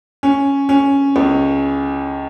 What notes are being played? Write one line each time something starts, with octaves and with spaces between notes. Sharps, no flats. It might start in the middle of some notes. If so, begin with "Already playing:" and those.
C#4
C#4
C#2